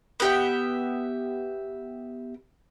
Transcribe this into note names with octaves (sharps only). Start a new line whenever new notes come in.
B3 G4 E5